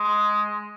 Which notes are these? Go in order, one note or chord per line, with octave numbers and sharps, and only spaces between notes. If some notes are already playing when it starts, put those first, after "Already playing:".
Already playing: G#3